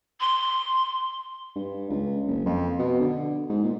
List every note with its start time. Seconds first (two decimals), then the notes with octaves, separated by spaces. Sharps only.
0.20 C6
1.56 G2
1.90 C#2
2.27 F#1
2.46 F2
2.79 B2
3.00 D3
3.50 G#2
3.64 A#2